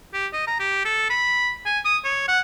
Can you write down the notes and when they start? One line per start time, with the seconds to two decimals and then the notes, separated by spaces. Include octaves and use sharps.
0.14 G4
0.33 D#5
0.47 A#5
0.60 G4
0.85 A4
1.10 B5
1.66 G#5
1.85 D#6
2.04 C#5
2.28 F#5